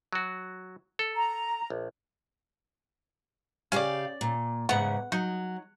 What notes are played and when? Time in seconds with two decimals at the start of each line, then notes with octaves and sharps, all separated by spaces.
0.13 F#3 F#4
0.99 A4
1.15 A#5
1.70 A#1
3.72 C#3 C#4 G4 D5 F5
4.21 A#2
4.69 E2 G#2 C#3 B3 F#5
5.12 F#3 D#4